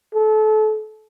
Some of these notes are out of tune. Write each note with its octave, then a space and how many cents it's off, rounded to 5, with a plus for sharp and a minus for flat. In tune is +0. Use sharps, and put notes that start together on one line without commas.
A4 -30